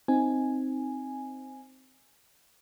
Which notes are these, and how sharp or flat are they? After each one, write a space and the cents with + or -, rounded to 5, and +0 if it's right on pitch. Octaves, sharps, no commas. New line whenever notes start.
C4 +0 D#4 +0 G#5 +0